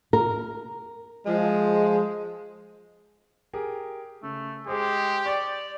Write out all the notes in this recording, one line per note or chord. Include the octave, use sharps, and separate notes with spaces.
A#4
F3 G#3
G4 G#4 A#4
C#3 A3
G#3 G4 G#4 C5
D5 C#6 A6 C#7